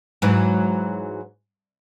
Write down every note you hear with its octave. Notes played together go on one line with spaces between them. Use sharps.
G#2 E3 F#3